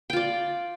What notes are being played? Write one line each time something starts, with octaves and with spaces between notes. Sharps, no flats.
F4 D5 G5